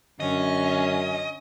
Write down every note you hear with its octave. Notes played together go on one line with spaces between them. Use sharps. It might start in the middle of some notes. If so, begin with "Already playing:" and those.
F#2 D3 C#4 D#5